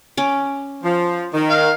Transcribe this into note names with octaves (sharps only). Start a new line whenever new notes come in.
C#4 D6
F3
D#3
F5